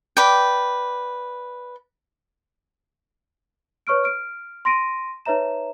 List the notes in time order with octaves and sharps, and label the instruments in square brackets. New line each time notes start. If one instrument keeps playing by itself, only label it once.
[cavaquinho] B4 D5 G5
[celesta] B4 C#5 C#6 F6 D7
F6 D7
C6 A#6 D7 D#7
D#4 B4 C#5 E5 A#5 E7